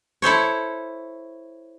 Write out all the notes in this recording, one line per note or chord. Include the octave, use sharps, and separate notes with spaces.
E4 A4 C5 C#5